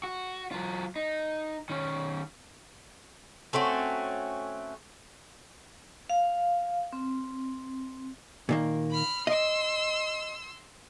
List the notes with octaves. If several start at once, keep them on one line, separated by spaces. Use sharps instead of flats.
F#4
F#3 F4
D#4
D#3 C#4
A3 C4 C#4 F#4
F5
C4
A#2 D#3 A#3
B5 F6
D#5 C6 E6